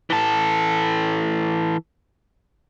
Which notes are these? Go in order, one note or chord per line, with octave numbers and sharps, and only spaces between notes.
E3 A4